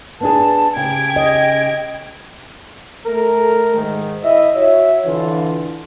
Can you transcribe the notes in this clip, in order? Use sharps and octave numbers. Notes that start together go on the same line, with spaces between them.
B3 D4 G#4 A5
C#3 G4 G5 G#6 D7
D#5
A3 A4 A#4
G#2 D#3
E4 D#5 E5
F#4 C#5 E5
D3 E3 F4